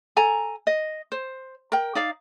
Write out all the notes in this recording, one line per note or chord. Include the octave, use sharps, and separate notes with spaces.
A4 G#5 A#5
D#5
C5
A#4 G5
D#4 D5 F5